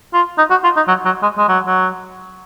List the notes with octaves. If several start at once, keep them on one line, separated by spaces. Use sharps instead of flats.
F4
D#4
F#4
F4
D#4
F#3
F#3
G#3
G#3
F#3
F#3